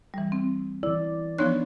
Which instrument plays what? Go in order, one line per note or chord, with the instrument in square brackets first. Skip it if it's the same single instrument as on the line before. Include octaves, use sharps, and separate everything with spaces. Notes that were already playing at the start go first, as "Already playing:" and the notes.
[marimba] E3 G3
C4
[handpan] E3 D5 [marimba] E4
[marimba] F3 B3 F#6 [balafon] D4 D#4 C#5